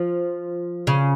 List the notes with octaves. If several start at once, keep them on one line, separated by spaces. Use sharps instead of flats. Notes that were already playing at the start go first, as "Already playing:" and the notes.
Already playing: F3
C#3